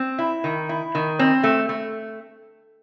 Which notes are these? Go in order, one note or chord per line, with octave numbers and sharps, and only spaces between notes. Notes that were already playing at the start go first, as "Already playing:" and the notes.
Already playing: C4
E4
D#3
E4
D#3
C4
A3
A3